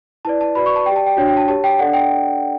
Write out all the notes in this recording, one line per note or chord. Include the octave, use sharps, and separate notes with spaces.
E4 B4 D5 A5
A5
F#4 B4 D5 B5
C#6
A5
G4 D5 G5
A5
G5
D4 F#4 C#5 G5
G5
A5
G4 C#5 A5
G5
D4 A4 D5 F#5
G5